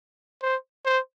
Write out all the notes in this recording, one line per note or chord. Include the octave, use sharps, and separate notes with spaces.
C5
C5